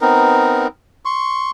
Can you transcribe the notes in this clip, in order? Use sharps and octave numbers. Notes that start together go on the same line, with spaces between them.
B3 C4 D#4 A#4
C6 C#6